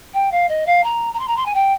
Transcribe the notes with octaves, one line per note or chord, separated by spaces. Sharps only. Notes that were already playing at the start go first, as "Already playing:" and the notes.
G5
F5
D#5
F5
A#5
A#5
C6
A#5
C6
G#5
G5